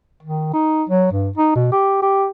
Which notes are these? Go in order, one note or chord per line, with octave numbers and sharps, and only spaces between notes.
D#3
D#4
F#3
G2
D#4
B2
G4
G4